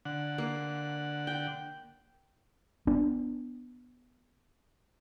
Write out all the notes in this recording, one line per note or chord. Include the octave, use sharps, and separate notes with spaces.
D3 F#5
A#3
G5
B3 D4